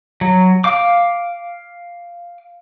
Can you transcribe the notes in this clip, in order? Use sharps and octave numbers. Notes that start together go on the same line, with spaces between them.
F#3
F5 D6